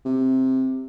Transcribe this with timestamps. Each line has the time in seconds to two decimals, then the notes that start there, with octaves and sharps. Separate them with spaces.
0.05 C3